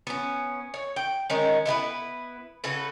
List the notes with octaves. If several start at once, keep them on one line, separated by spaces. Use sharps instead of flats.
B3 C#4
C#5
G5
D#3 G#3 C#4
B3 E4 G4 B4
C#3 F#4 A4 B4